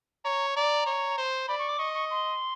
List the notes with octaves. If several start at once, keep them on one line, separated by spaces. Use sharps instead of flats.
C#5 A#5
D5 A#5
C#5
C5
D5 B5
C#6
D6
D#5 C#6
C#6
C6